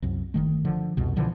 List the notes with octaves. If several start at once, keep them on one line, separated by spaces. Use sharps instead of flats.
C2 F#2
G1 D#3 A3
D3 F3
C2 F2 B2
B2 D3 E3 F3